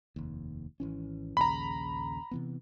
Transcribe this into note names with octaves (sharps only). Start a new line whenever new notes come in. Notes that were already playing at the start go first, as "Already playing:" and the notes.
F1 D#2
G#1 E3 C#4
A#1 D#2 C#3 A#5 B5
C3 E3 B3